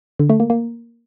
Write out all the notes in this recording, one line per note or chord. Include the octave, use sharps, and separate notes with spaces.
D3
A3
A#3
A#3